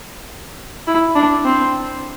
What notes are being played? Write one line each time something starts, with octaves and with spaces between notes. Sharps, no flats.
E4
D4
C4